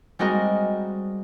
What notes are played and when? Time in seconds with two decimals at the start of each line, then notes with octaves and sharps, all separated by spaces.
0.19 G3 G#3 C4 F#4 A#4 D#5